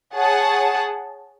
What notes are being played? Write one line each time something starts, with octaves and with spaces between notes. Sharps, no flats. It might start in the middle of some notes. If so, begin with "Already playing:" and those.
G#4 C#5 F#5 A5